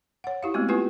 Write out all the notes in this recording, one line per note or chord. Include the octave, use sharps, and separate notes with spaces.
C#5 F#5
E4 G4 F5
G#3 A3 B3 C4 F#4
A#3 E4 F4 G4 B4 G#5